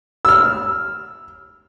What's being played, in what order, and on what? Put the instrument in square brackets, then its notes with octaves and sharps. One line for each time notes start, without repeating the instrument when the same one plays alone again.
[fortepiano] E6 F6